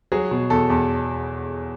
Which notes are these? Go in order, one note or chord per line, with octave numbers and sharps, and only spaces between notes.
F#3 G#4
B2
E2 A4
E2